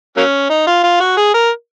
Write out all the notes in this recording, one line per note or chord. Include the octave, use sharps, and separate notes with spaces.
F#3 A#3 C#4
D#4
F4
F4
F#4
G#4
A#4